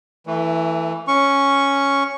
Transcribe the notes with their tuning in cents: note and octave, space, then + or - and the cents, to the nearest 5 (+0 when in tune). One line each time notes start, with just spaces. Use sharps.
E3 +0 A3 +25
C#4 +0 C#6 +0